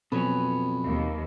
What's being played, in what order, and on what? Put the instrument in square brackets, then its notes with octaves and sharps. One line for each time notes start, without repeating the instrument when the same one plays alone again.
[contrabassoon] F2 [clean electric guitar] B2 F#3 C#4 [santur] B4
[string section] D#2